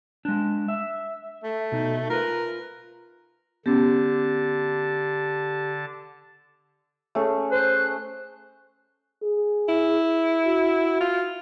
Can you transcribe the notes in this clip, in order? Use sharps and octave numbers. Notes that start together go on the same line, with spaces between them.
G#3 D4
E5
A3
B2 D#4
F4 A#4 B4
D3 B3 C#4 G4 A5
A3 C#4 G#4
C5 F#6
G#4
E4
F#4
F4